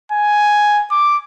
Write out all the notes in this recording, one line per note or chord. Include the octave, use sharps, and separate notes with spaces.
G#5
D6